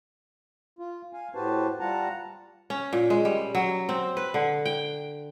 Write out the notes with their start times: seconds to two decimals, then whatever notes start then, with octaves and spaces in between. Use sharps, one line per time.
0.79 F4
1.13 F5 G#5
1.35 A2 F#4 G4 B4 C5 A5
1.80 G3 F4 F#5 A5 A#5
2.70 C#4
2.93 A#2
3.10 G#3
3.25 G3
3.55 F#3
3.89 C4
4.17 B4
4.34 D3
4.65 G5